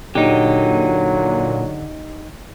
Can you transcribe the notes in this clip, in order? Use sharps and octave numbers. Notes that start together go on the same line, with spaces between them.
A#2 D3 F#3 D#4 G4